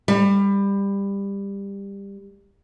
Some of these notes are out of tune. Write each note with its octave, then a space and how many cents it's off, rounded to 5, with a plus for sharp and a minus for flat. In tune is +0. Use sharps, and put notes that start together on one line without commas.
G3 +20